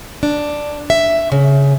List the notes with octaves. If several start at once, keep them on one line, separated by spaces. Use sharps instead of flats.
D4
E5
C#3